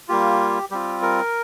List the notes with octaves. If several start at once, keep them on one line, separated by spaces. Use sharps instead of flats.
G3 A#3 F4 G4
G3 C4 F4 G4
A#4